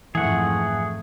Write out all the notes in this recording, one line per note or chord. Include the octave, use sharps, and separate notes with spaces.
F2 G#2 E3 A3 G#4 F#5